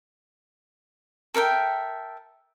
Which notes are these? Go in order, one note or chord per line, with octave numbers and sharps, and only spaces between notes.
A4 A#4 E5 G5